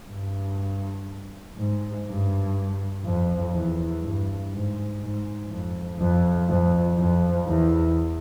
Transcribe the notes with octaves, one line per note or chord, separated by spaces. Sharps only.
G2
G#2
G2
F2
E2
G2
G#2
G#2
F2
F2
F2
F2
E2